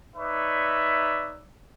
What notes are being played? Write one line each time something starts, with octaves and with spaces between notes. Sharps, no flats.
D#4 B4 C#5 D5 E5